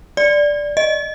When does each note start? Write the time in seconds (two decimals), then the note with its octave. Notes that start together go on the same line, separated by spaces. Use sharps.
0.17 D5
0.77 D#5